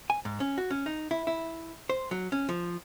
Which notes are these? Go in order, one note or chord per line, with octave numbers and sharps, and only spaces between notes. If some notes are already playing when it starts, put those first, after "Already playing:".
G#5
G#2
C#4
F#4
C#4
D#4
E4
E4
C5
F#3
C#4
F3